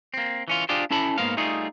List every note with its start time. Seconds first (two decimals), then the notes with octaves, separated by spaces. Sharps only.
0.14 A#3 C4
0.48 E3 C#4 F4
0.69 D4 F4 G4 G#4 C5
0.91 C#4 E4 A4 A5 B5
1.18 G#2 A#3 B3 A#4 C5 F5
1.37 G3 A3 D#4 F4 G#4